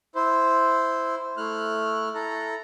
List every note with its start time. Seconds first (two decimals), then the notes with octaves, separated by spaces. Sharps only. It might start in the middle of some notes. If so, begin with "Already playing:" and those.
0.15 E4 C5
1.37 A3 E4 F6 F#6
2.15 E4 A4 A#5